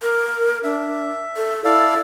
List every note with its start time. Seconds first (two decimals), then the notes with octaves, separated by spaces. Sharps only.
0.02 A#4
0.64 D4 E5
1.36 A4
1.64 E4 A4 D5 F5